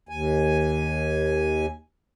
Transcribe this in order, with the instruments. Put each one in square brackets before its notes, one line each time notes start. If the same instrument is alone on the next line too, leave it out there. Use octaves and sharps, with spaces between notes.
[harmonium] D#2 G#5